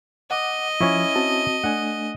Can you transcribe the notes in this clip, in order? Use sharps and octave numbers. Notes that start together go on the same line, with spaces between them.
D#5 F#5 D6
F3 C#4 E4 C#6
C4 F#4 A5
A3 D4 F#5 G#5